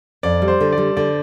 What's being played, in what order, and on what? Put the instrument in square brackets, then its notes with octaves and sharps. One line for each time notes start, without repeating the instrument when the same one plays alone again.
[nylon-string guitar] F2 [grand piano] D5
[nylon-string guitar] G3
[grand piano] C5
[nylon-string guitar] D3
[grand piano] D5
[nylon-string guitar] G3
[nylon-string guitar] D3 [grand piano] D5